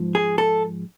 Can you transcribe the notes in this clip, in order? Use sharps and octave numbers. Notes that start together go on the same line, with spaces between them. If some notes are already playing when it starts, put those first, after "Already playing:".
Already playing: G#2 F3
G#4
A4